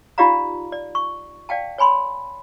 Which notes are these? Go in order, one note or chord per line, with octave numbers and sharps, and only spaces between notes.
D#4 F4 G4 D5 F5 A#5
D5
C#6
D5 F5 G5 A5
C#5 G#5 B5 C6